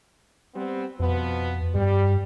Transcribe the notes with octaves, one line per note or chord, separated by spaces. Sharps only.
G3 B3 C4
F2 B2 F3 B3
G2 G3